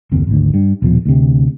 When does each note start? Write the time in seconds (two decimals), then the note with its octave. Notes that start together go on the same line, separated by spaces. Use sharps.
0.12 F#1 D#2 C4
0.27 G#1 D2
0.54 G2
0.82 D#1 B2 F3
1.06 D2 C3